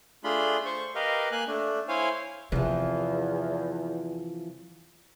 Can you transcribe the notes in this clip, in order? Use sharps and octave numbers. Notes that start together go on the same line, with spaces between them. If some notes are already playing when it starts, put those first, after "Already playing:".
A3 D4 F4 G#4 B5 C6
C5 C#6
G4 A#4 B4 D#5 F5
A#3 G#5 F#6
A3 D4
E4 C5 C#5 F5 G#5
E2 C3 E3 F3